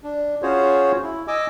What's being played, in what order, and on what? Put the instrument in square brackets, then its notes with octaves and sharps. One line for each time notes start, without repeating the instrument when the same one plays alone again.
[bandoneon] D4
C#4 F4 F#4 G#4 C5 C#5
E4
D#5 G#5 D6 E6